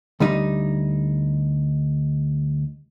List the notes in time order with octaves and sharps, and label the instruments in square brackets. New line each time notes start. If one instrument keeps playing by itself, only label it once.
[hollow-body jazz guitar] D2 G3 D#4